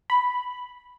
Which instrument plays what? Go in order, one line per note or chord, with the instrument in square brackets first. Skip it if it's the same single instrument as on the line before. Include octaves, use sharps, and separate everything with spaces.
[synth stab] B5